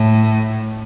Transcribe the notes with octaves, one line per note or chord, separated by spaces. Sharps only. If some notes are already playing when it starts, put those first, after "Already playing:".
Already playing: A2